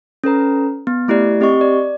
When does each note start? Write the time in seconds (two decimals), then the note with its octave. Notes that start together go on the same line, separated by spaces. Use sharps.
0.24 C#4 A4 B4 A#5
0.87 B3
1.08 A3 E4 G4 D5
1.41 C4 G4 D#5 C#6
1.61 D5